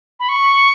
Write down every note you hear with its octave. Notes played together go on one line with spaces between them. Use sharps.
B5
C#6